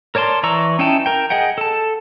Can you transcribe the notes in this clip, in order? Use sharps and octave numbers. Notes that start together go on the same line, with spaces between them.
A#4 C#5 D5 A5 C6
E3 D5 A#5 C#6 E6
C#4 D#4 E4 G5 A5
A#4 G5
G#4 D#5 F#5 G5
A4 A5